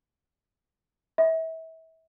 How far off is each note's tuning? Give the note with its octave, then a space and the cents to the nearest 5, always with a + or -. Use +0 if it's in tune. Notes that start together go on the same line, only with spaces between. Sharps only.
E5 -30